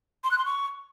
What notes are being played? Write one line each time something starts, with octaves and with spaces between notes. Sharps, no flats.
C6
F#6
C6
C#6